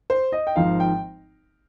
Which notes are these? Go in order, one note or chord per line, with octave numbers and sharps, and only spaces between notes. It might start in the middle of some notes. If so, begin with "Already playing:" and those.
C5
D#5
G5
G#1 G#2 F3 F5
G5